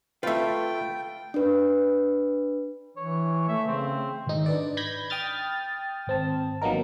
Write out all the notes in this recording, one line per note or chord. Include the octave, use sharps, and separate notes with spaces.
A3 F4 B4 E5 G5
D4 B4
E3 C#5
A3 E5
C#3 C4
G#1 D#4
D4 B4 D5
B5 G6 G#6 A#6 B6
G5 D#6 F6 A6
G#1 C4 A5
D#3 F#3 A#3 B3 D#4 A#4